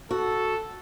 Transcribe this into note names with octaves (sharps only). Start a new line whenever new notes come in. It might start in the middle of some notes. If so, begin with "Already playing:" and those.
F#4 A4